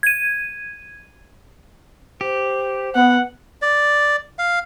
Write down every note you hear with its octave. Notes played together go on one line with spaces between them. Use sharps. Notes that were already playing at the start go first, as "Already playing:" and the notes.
G#6 D#7
G4 C5
B3 F#5
D5
F5